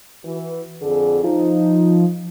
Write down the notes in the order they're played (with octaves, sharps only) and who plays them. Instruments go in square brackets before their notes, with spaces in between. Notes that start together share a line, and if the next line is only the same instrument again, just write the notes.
[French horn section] E3 F#4
F2 D3 G#4
[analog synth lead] F3 [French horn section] D#4